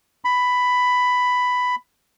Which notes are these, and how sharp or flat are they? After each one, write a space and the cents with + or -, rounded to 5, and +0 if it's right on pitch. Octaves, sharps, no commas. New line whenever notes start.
B5 +10